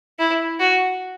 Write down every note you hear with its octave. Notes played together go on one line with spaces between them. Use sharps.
E4
F#4